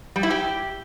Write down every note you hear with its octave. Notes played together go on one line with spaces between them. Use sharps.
G3
E4
G4